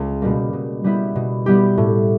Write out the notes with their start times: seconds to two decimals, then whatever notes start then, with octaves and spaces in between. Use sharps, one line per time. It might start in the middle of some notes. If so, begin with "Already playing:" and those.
Already playing: C#2
0.22 B2 G3 A#3
0.53 B2
0.84 G3 B3 E4 G4
1.15 B2
1.46 G3 B3 E4 G4
1.78 A2